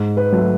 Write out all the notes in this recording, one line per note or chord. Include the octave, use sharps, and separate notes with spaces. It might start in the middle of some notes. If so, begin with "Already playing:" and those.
Already playing: G#2
B4
F#3 A3